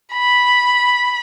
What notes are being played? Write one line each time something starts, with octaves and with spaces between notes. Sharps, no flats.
B5